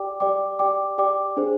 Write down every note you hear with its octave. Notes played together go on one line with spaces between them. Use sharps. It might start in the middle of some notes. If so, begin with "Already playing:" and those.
Already playing: G4 D5 G5 D6
G4 D5 G5 D6
G4 D5 G5 D6
G4 D5 G5 D6
D4 G#4 C5